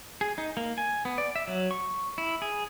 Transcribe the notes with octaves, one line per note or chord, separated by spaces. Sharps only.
G#4
D#4
A#3
G#5
B3
D5
E5
F#3
C#6
E4
G#4